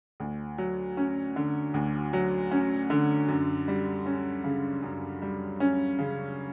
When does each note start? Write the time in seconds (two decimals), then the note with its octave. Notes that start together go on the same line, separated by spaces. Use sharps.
0.20 D2
0.58 F#3
0.97 C#4
1.36 D3
1.74 D2
2.13 F#3
2.51 C#4
2.90 D3
3.28 F#2
3.68 G3
4.06 C#4
4.44 C#3
4.83 F#2
5.22 G3
5.60 C#4
5.99 C#3